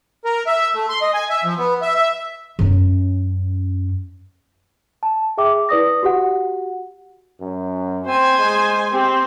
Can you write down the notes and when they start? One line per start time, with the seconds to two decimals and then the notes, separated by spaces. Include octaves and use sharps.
0.25 A#4
0.47 E5
0.74 A3
0.89 C6
1.01 D#5
1.14 G#5
1.30 E5
1.44 F3
1.58 B3
1.82 E5
1.95 E5
2.59 F#2 C#4
5.03 A5
5.37 G#4 E5 G5 D6
5.69 E4 B4 D5 D#6 A#6
6.03 F#4 G4 F#5
7.41 F#2
8.06 C4 C5 G#5
8.38 G#3
8.92 C4 G4